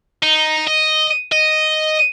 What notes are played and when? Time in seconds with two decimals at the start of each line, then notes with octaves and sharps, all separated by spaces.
0.23 D#4
0.67 D#5
1.32 D#5